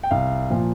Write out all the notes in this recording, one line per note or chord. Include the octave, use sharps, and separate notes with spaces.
G5
C2 F5
A#2 F3